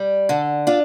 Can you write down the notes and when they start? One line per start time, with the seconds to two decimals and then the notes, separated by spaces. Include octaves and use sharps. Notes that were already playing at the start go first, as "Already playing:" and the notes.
Already playing: G3
0.29 D3 A4
0.67 D4 F4